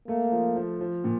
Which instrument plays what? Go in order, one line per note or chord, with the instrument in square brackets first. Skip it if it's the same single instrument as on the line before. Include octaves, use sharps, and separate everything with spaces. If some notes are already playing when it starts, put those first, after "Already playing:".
[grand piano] A3 [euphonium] A#3
[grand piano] F3
F3
F3
A#2